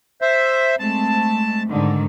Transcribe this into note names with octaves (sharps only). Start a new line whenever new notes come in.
C5 E5
G#3 A3 C4 A5
G#2 D3 D#3